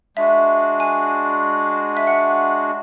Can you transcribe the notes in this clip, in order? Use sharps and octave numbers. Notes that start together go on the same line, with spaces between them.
G#3 D4 F#4 E5
G#5
E5
F#5